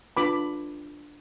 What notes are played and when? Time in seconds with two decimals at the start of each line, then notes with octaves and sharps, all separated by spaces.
0.17 D4 F4 B4 B5 D6